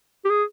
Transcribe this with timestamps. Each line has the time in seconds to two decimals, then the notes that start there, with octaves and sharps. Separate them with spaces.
0.25 G4
0.30 G#4